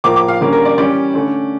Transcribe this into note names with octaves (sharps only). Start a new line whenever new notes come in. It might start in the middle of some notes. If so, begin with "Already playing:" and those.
A2 F3 A#3 D6
D6
F5
D3 G3 A#3 C#4
A#4
D5
E3 G3 C#4 D5
D3 A3 C#4